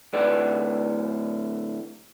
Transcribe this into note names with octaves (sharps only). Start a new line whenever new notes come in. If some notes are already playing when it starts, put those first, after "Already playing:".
D2 A2 B4 D5